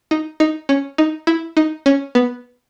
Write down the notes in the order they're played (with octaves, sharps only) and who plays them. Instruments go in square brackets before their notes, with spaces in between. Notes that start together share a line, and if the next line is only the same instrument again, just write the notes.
[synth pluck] D#4
D#4
C#4
D#4
E4
D#4
C#4
B3